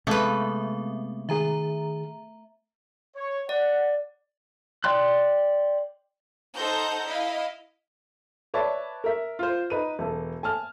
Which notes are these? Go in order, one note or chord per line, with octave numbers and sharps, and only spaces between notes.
C3 G#3 A3 B3 C4 B4 E5
D#3 G#4 E5 A#5
C#5
D5 F#5
D5 G5 C6 F#6
D#4 A4 C5 F#5 A#5 G6
E4 D#5 F5
B4 C#5 D5 E5 A5
A#4 E5
F4 C5
D#4 B4 D#7
E1 A4
G#5 A5 F6